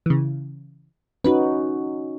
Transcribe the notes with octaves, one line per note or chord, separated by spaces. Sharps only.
C#3 E3
C#4 D#4 F#4 B4